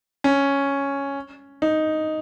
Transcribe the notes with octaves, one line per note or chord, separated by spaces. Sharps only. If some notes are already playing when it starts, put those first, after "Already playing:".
C#4
D#4